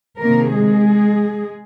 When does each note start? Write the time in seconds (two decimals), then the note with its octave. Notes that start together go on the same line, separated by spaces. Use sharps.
0.19 C3 D#3 A#3 A#4
0.53 G#3 G#4